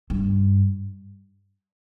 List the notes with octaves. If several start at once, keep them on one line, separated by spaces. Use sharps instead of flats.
G2